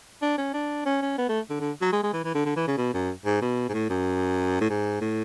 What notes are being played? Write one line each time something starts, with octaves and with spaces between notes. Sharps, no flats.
D4
C#4
D4
C#4
C#4
B3
A3
D3
D3
F#3
G#3
G#3
E3
E3
D3
D3
E3
C#3
B2
F#2
G#2
B2
G#2
A2
F#2
A2
G#2
A2